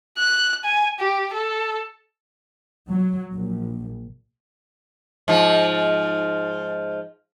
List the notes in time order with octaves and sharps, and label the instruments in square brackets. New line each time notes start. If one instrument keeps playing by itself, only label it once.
[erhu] F#6
G#5
G4
A4
[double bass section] F#3
A#1
[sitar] G#2 F3